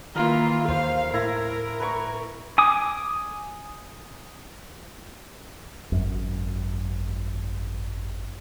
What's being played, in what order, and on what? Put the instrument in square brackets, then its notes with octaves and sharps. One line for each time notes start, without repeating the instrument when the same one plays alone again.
[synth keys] D#3 A#3 [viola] E3 F4 [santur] A#4
[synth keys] D#2 [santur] C5 [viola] F5
[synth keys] A2 A#6 [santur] E4 [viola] A#4
[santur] B4 A#5 C#6
[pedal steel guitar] G#5 D6 D#6
[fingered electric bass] G#1 F#2